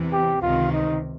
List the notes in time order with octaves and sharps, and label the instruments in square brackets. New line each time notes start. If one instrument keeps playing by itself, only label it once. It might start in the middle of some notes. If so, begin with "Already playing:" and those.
Already playing: [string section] E2 C3 E3
[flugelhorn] G4
[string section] C#2 C3 D#3 [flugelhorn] F4
[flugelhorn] D#4